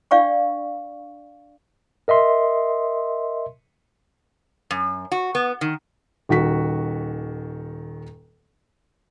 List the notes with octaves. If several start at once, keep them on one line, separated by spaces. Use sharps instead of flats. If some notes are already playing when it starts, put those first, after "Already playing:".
D4 D5 F5 G5 C#6
A#4 D#5 E5 C6
F#2
F#4
B3
D#3
D#1 D#3 F#4 B6